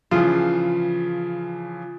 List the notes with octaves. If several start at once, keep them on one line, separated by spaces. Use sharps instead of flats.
C#3 E3 F3 F4